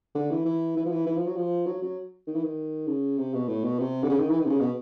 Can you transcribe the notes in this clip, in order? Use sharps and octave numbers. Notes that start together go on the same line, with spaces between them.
D3
E3
E3
E3
F3
E3
E3
F3
F#3
F3
F#3
F#3
D#3
E3
D#3
C#3
C3
B2
A2
B2
C3
D3
C#3
D#3
E3
D#3
C3
C#3
B2